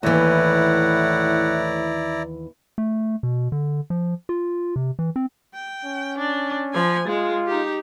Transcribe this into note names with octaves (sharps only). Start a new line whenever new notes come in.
D#2 A2 E3 E4 D5 F#5 A#5
A3
B2
D3
F3
F4
C3
E3
C4
G5
C#4
D4
F3 G#5
G#3 F4
D#4 G4